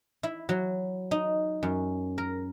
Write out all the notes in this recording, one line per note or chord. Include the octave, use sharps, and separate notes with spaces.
E4
F#3
D#4
F#2
A#4